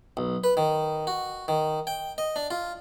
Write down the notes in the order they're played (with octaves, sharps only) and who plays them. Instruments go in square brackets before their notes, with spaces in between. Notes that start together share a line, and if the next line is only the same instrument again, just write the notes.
[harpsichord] B1
B4
D#3
F#4
D#3
G5
D#5
D4
F4